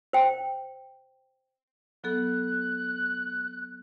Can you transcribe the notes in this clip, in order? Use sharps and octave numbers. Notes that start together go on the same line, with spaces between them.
C5 G5
F#3 B3 A4 F#6